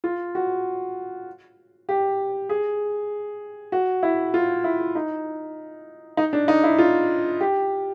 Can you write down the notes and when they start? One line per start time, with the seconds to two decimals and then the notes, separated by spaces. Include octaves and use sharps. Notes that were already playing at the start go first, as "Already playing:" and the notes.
0.04 F4
0.35 F#4
1.89 G4
2.49 G#4
3.72 F#4
4.03 E4
4.34 F4
4.64 E4
4.95 D#4
6.17 D#4
6.33 D4
6.48 D#4
6.64 E4
6.78 F4
7.41 G4